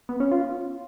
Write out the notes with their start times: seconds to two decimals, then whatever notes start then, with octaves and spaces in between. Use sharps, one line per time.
0.09 B3
0.20 C#4
0.31 F4